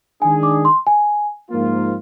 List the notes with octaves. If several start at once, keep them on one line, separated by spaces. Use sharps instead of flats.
D#3 G#3 D4 G#4 G#5
D6
C6
G#5
G#2 F3 A#3 F4